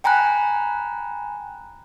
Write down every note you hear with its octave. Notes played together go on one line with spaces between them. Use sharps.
G5 G#5 A#5 B5 F#6